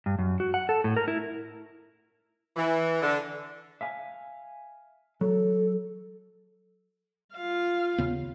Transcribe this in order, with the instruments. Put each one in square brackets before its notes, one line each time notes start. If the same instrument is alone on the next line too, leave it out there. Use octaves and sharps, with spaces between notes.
[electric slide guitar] G2
F#2
F#4
F#5
A4
A2
A#4
E4
[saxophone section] E3
D3
[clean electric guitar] E5 F5 G#5
[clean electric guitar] F#3 [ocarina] A4
[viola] F4 F5
[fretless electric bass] D#2 C#3 B3